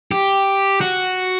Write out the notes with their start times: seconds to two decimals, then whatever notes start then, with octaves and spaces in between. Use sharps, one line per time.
0.11 G4
0.81 F#4